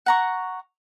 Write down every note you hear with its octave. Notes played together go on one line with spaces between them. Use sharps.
F#5 A#5 C#6